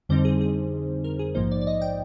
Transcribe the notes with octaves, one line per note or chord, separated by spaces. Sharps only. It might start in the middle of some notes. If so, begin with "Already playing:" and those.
F2 D3 G3 C4 D#4 C5
G#4
G#4
A#4
G#4
A#1 G#2 F3 A#3 D#4 C5
D5
D5
D#5
G5